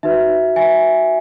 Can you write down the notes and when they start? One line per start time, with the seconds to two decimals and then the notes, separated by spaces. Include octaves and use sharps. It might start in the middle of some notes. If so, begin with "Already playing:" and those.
0.03 D#4 F#4 B4 E5
0.56 E5 G#5